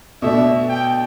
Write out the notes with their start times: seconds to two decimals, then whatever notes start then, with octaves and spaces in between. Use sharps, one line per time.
0.22 B2 A3 D4 E5
0.69 G5